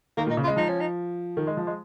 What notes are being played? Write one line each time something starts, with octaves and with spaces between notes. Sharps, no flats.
D#3 A#3
A#2 D#4
C#3
F4
G#3
F3 D#4
C#4
D#4
D#3
G#3
F3
G#3